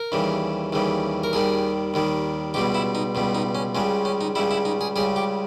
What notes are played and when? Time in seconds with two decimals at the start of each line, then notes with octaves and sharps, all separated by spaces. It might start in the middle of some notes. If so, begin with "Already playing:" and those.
Already playing: A#4
0.12 D#2 C#3 E3 G3
0.73 D#2 C#3 E3 G3
1.24 A#4
1.33 D#2 D#3 G3 G#4
1.94 D#2 D#3 G3
2.54 C#2 B2 G3 G4
2.74 E4
2.95 D#4
3.15 C#2 B2 G3
3.35 D#4
3.55 C#4
3.75 C#2 C#3 G3 G#3
4.05 C#4
4.21 D#4
4.35 C#2 C#3 G3 E4
4.51 E4
4.65 D#4
4.81 G#4
4.96 C#2 C#3 G3 G#4
5.16 G4